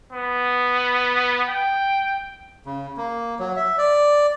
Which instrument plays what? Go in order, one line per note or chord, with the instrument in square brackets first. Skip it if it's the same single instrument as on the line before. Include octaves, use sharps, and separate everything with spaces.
[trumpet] B3
G5
[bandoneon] C#3
A#3
F#3
E5
D5